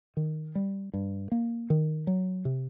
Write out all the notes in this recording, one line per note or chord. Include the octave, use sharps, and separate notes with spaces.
D#3
G3
G2
A#3
D#3
F#3
C3